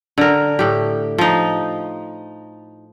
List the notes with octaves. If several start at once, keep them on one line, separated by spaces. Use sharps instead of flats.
D3 A#4
A2 G4
F3 D#4